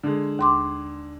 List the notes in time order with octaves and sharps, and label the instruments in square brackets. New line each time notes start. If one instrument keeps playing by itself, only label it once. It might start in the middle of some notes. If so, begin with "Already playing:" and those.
[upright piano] D3 G#3
[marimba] D#2 C6 D6